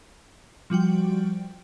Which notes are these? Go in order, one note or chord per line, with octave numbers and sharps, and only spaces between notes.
F3 G3 F#4 G5